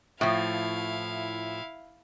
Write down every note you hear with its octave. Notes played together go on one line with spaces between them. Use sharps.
A2 F3 E4 F5